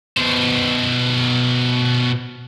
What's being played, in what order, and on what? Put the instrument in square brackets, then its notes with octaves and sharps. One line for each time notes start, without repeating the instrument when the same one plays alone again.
[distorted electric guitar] B2 C5